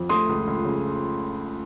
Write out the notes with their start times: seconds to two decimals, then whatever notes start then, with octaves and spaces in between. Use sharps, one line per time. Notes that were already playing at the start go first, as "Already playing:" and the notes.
Already playing: F2
0.09 A3 C6 D#6
0.29 C#2
0.47 C#2
0.65 C#3